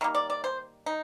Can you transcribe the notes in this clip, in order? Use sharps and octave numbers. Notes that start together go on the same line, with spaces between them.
D#3 G3 A#3
D5
D5
C5
D#4